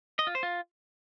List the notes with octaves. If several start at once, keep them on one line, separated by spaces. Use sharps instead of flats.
D#5
F4
C5
F4